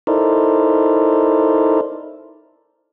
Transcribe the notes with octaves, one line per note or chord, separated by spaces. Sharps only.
D#4 E4 A4 A#4 C5 D5